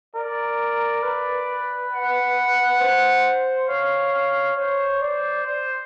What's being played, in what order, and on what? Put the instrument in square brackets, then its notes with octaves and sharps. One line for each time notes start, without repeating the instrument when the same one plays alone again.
[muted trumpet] A#4 [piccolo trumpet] D5
[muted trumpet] B4
[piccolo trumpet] F#5
[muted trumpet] C5
[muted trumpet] C#5 [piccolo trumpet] F5
[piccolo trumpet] F5
[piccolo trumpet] C5 [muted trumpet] C#5
[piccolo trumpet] C5 [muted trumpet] D5
[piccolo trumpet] C5